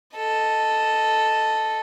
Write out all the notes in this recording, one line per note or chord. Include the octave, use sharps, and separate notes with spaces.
A4 D#5